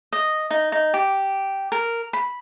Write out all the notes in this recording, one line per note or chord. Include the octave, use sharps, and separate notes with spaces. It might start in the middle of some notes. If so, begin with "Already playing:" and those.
D#5
D#4
D#4
G4
A#4
B5